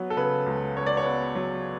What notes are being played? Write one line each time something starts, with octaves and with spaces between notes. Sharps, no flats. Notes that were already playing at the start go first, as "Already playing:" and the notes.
Already playing: F#3 B3
A4
C#3 B4
C#2
C#3 C#5
D5
C#5
B3
F#3